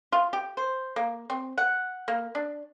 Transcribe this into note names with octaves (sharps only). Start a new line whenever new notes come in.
F4
G4
C5
A#3
C4
F#5
A#3
D4